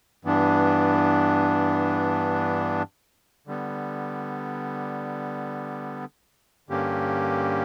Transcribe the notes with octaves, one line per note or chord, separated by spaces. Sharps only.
G2 E3 B3 D4
D3 G3 B3
G2 D3 A#3 C#4 G4